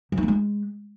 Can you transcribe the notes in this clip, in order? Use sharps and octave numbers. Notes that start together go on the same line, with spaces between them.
F#3
D#4
A#3
G#3